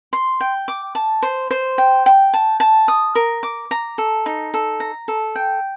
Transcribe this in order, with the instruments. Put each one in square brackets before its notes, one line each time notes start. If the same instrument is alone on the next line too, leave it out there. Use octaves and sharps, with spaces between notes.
[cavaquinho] C6
G5
D6
A5
C5
C5
G5
G5
A5
A5
D#6
A#4
D6
A#5
A4
D#4
A4
A#5
A4
G5